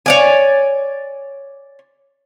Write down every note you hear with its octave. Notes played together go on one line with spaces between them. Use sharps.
C#5 D5 G#5